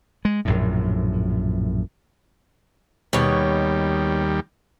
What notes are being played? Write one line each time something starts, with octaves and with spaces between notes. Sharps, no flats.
G#3
A#1 F#2 A2
D#2 B2 G3 C#5